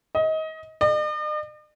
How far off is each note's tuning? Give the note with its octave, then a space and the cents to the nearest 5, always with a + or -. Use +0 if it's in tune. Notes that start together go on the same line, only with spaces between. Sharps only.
D#5 +25
D#5 -45